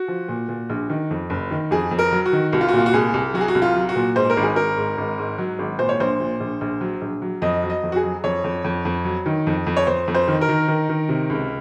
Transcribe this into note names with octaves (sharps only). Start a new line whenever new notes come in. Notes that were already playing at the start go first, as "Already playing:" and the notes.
Already playing: F#4
F3
A#2
A#2
A#1
D#3
F2
F#1
D#3
F2 G#4
F2
A#4
F#3
F#4
D#3
C2 F#4
F4
A#2 F#4
F4
F#4
C2 G#4
C2
F#3 F#4
G#4
F#4
C2
F4
F#3
F#4
A#2
G#2 C5
A#4
G#1
G#4
G#1 A#4
G#2
G#1
G#2
F#3
G#1
A#2 C5
C#5
A#1 C5
A#2
A#1
A#1
F#3
A#1
F#3
F2 D#5
F#3
D#5
F2
F#4
G#4
F#3
F2 C#5
F2
F2
F2
F#3
D#3
F2
F2
C#5
F2 C5
F2
C5
D#3
A#4
D#3
D#3
D#3
C3
C#2